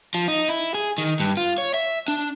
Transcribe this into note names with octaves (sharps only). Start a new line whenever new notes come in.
F3
D#4
E4
G#4
D#3
G2
F4
C#5
E5
D4